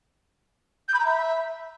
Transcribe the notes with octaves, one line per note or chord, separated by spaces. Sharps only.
G6
B5
A#5
E5